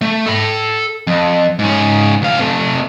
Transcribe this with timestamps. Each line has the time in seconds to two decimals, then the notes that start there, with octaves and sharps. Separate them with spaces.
0.02 A3
0.26 A4 B5
1.07 F2
1.59 G#2 C#4
2.22 D2 F5
2.39 C3 A3